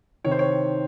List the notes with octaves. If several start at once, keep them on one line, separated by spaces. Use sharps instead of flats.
C3 D#3 C#5
C5
C#5